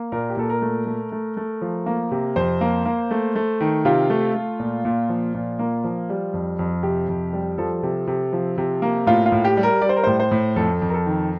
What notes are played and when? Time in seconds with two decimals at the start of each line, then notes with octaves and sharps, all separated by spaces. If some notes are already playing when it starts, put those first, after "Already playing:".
Already playing: A#3
0.12 A#2 A#4
0.30 G4
0.37 A#2 A4
0.50 A#4
0.62 A3
0.86 A3
1.12 A3
1.37 A3
1.61 F3
1.86 A#3
2.11 C3
2.36 F2 C5
2.61 A#3
2.85 A#3
3.11 A3
3.35 A3
3.60 D#3
3.85 C3 F4
4.10 A3
4.35 A3
4.60 A#2
4.85 A#2
5.09 F3
5.34 A#2
5.59 A#3
5.84 F3
6.09 G3
6.34 F2
6.59 F2
6.83 C3 G4
7.08 F2
7.33 G3
7.58 F3 A4
7.83 C3
8.07 C3
8.33 F3
8.58 C3
8.82 A#3
9.07 A2 F4
9.26 F4
9.32 A2
9.45 G4
9.57 G3
9.63 A#4
9.81 G3 D5
9.89 C5
9.96 A#4
10.04 A2 C5
10.19 C5
10.31 A2
10.56 F2 A4
10.82 F2
10.89 A#4
10.94 A4
11.06 D#3